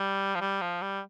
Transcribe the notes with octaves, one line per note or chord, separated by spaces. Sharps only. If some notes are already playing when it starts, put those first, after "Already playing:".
Already playing: G3
F3
G3
F3
G3